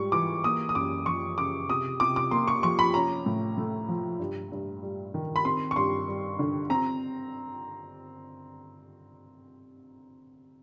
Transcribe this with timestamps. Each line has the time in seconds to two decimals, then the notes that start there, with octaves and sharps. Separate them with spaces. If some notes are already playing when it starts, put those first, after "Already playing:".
Already playing: G#2 G3 C#6
0.12 E3 D6
0.44 A#3 D#6
0.69 D#6
0.75 F#2 D6
1.06 F3 C#6
1.38 C#3 D6
1.69 C3 D#6
2.00 C3 D6
2.16 D6
2.31 A#3 C6
2.48 C#6
2.63 F3 C#6
2.79 B5
2.94 C#4 A#5
3.26 A2
3.58 A3
3.88 F3
4.20 G2
4.52 G2
4.83 G3
5.14 D#3
5.36 B5
5.45 C4 C6
5.71 C#6
5.76 G2 C6
6.08 G3
6.39 D3
6.70 C4 A#5